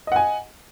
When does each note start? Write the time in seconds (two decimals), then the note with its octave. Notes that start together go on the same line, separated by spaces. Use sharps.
0.07 D#5
0.12 F#5
0.16 G#5